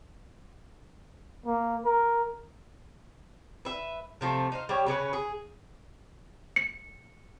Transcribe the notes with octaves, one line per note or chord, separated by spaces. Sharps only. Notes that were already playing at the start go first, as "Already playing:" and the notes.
A#3
A#4
B4 E5
C3 F3 A3
D#4 C5 F5
G3 G4 C#5
C#3 C#4 D4 B4
G#4
C#7